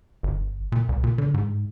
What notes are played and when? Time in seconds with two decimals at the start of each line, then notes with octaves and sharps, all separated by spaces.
0.23 G1
0.72 A#2
0.89 C2
1.04 A#2
1.18 D3
1.34 G#2